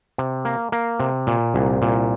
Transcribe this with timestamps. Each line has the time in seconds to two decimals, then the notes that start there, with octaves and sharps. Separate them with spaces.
0.18 C3
0.45 A#3
0.72 A#3
1.00 C3
1.27 A#2
1.54 C2
1.82 A#2